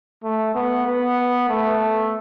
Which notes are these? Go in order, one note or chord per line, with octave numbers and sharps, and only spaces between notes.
A3
B3
B3
A3